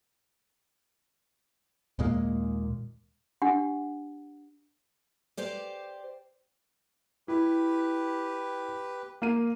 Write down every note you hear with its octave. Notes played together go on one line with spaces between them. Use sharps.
D#2 A#2 G#3 A#3
D4 G4 F#5
G4 C5 D5
E4 G4 B4
A#3 F5 D#7